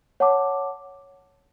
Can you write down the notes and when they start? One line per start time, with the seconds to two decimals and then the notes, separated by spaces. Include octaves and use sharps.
0.20 C#5 F#5 A5 D6